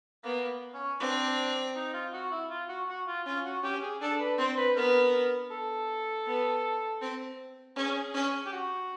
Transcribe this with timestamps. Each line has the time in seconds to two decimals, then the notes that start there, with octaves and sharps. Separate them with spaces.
0.24 A#3 B3
0.74 C#4
1.00 C4 D4
1.76 D#4
1.94 F4
2.13 F#4
2.31 E4
2.50 F4
2.69 F#4
2.88 F#4
3.07 F4
3.26 C#4 F4
3.45 F#4
3.63 C#4 G4
3.82 G#4
4.01 D4 A4
4.20 B4
4.38 C4 C5
4.57 B4
4.76 B3 A#4
5.51 A4
6.27 B3
7.02 C4
7.76 C#4 G#4
8.14 C#4
8.46 G4
8.52 F#4